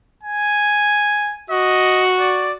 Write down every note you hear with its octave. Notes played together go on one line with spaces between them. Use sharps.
G#5
F#4 D#5
D5